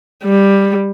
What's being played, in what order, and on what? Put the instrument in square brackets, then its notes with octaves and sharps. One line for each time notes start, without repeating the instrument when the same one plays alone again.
[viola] G3